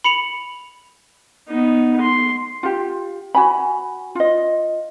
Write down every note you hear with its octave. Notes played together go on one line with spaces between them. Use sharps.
B5 C#7 F7 F#7
B3 D#4
C6
F4 G4
F#4 G#5 B5
F4 D#5